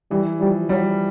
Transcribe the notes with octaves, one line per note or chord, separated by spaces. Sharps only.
E3 G3
F3 G3
F#3 G3